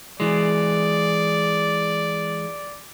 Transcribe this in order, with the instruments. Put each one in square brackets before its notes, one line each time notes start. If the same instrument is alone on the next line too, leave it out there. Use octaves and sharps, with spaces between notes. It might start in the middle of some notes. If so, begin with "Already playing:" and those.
[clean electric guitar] E3 G#3 [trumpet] D5